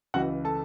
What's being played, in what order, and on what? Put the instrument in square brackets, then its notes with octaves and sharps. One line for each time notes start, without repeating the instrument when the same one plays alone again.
[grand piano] C#2 C#3 E3 F#4 F#5
A4 A5